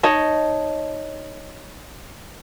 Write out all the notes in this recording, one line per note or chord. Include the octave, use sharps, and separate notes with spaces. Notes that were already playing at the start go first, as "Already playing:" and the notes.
D#4 C#5 D#5 A5